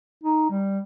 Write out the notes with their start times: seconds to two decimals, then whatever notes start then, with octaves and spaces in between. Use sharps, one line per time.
0.24 D#4
0.50 G3